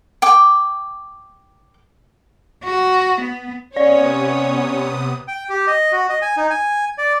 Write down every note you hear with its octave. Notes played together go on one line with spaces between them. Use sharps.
G5 D6
F#4
B3
C3 B3 C#4 C#5 D5 D#6
G5
G4
D#5
F#4
D#5
G#5
D#4
G#5
D5